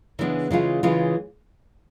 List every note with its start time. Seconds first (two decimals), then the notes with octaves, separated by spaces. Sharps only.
0.19 C#3 E3 G#3 B3 D4
0.51 C#3 E3 G#3 C#4 F4
0.83 C#3 E3 G#3 C#4 F4